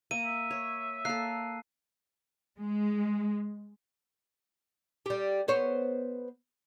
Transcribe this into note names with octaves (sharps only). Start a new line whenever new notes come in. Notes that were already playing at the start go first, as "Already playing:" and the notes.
A#3 D#7
E5
C#5
A#3 A4 F#6 C7
G#3
G3 G4
B3 C5 C#5